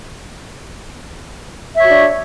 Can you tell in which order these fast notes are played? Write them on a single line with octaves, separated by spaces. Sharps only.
E5 C#5 F#4 D4